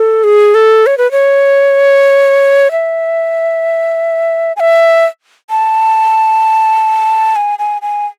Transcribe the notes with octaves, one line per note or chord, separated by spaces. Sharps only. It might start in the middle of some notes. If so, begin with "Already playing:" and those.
Already playing: A4
G#4
A4
C#5
B4
C#5
E5
G#5
E5
A5
G#5
G#5
G#5